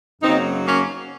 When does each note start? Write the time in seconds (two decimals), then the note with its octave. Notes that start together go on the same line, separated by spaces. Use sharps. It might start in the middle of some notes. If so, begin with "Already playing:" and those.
0.22 F#2 C#3 F#3 A#3 C4 D#4
0.66 A#3 C#4